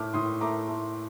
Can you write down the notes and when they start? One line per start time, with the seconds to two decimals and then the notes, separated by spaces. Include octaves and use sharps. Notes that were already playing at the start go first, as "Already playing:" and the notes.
Already playing: A2 A3 D6 F6
0.14 A2 C6 D#6
0.41 A3 A#5 D6
0.68 A3